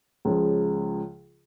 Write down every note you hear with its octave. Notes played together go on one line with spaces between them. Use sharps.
C#2 C#3 F3